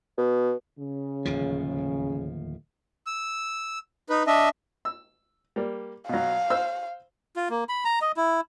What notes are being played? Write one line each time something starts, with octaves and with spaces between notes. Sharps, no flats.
B2
C#3
D1 D#2 F3
E6
D#4 B4
D4 D#5 E5
E6
G3 A#3
B2 F#3 F5
C5 E6 F6
F4
A#3
B5
A#5
D#5
E4